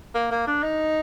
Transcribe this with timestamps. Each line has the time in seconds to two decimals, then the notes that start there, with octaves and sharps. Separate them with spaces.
0.15 A#3
0.31 A#3
0.47 D4
0.63 D#4